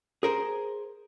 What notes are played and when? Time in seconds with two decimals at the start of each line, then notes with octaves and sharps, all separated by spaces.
0.23 G#4 A#4 C5